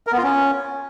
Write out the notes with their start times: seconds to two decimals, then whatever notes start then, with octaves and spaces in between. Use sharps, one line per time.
0.07 A#4
0.12 B3
0.18 F4
0.23 C#4